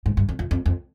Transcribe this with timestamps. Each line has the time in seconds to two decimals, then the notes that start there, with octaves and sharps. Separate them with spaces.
0.06 G#2
0.17 G2
0.29 F2
0.39 F2
0.51 F2
0.66 F2